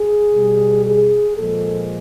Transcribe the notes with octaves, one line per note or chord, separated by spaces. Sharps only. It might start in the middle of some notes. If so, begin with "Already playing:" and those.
Already playing: G#4
B2 G3
G#4
A#2 F3 G#3 A4